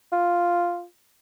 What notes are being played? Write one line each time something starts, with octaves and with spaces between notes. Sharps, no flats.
F4